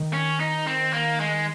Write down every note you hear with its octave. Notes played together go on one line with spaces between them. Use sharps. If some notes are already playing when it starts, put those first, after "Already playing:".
Already playing: D#3
C#4
D#4
C4
A#3
G#3